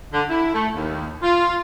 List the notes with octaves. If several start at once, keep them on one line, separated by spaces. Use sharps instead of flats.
D3
E4
A3
D#2
F4